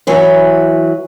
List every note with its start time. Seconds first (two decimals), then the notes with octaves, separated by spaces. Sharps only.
0.07 E3 F#3 B4